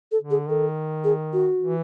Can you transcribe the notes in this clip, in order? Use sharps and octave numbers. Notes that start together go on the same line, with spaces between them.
A4
D3
G#4
D#3 A4
G#4
F#4
E3